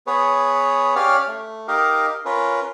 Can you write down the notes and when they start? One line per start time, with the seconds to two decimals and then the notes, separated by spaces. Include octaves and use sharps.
0.07 B3 G#4 B4 C#5
0.96 C#4 G4 C#5 D5 F5 F6
1.27 A3
1.68 D#4 G4 A#4 D#5 F5
2.25 C#4 F4 A#4 B4